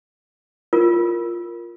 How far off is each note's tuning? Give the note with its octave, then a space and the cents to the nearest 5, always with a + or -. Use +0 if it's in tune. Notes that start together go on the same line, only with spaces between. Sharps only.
F4 +0 A#4 +0